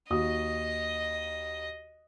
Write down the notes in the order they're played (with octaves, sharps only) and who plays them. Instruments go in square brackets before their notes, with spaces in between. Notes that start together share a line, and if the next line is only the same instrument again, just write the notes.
[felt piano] D#2 F#4 D#6 [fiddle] D#5